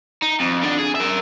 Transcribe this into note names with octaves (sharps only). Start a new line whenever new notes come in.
D#4
F2
D3 D4
G#4
A#4 E5